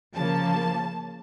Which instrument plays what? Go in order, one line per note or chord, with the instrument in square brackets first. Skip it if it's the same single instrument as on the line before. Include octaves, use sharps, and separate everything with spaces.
[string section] C#3 F3 A#3 A5